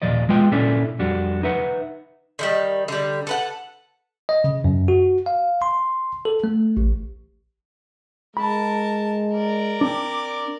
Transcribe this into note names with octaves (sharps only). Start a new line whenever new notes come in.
D#2 A#2 F3 D5 D#5
G#3 B3 F4 G5
A#2 C#4 D4 E4 A4 D5
F2 G3 D4 F#4
D#4 B4 E5 F#5
D3 D#3 G3
D3 G3
A4 B4 F#5
D#5
C#3
F#2
F#4
F5
C6
A4
A3
A1
G#3 A#4 A5 B5
A#4 D5
C4 D4 D6